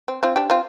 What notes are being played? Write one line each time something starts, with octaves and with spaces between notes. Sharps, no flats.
C4
C4 F4
D4 G4
C4 F4